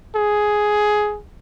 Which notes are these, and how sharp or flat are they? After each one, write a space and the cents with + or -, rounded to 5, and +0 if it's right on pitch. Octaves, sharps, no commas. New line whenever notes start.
G#4 +10